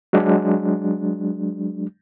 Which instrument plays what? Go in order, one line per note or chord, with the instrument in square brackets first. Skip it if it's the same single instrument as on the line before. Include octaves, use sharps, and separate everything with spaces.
[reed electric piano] F#3 G#3 D4